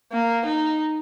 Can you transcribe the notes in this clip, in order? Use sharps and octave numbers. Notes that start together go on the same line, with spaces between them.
A#3
D#4